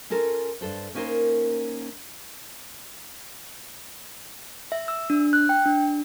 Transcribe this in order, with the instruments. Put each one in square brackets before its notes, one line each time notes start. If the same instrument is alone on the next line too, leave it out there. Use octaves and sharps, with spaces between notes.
[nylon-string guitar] C#4 F4 A4 A#4
G2 A4 C5
A#3 C#4 D#4 A#4 C5
[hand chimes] E5
E6
D4
F#6
G5
D4